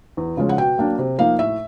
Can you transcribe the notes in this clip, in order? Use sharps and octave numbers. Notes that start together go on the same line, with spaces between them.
E2
C#3 F3 G#3 C#4
F#5
B2 G5
F#3 A#3 D4
C3
F3 A#3 D#4 F5
A2 E5